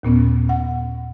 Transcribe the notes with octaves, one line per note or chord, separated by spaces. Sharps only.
D#2 A#2 B3 C#4
F#5